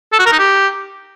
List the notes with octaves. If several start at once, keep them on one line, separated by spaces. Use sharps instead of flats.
A4
F#4
A#4
D#4
G4